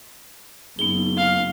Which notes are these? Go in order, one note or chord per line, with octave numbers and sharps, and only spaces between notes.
F#1 B3 D#4 G#4 G7
F5